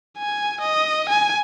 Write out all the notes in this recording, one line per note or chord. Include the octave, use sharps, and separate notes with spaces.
G#5
D#5
G#5